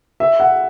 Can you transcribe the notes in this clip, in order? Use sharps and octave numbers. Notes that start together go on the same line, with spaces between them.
E5
F#5